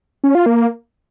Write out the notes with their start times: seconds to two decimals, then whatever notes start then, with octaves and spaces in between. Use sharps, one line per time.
0.24 C#4
0.35 F4
0.46 A#3